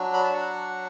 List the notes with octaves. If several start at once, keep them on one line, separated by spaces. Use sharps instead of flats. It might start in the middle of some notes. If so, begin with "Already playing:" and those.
Already playing: F#3 D4 F#4
B5
A5
F#5